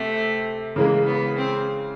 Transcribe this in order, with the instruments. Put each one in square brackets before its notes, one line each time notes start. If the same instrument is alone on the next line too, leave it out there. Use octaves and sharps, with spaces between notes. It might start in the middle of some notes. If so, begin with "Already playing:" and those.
Already playing: [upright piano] C3 [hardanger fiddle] A3
[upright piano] C#3 E3 G#3 [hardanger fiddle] A#3
[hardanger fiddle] B3
C4